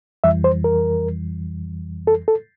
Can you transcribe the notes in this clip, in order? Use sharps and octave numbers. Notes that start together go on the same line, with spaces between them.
F2 E3 G3 E5
C5
A#4
A4
A4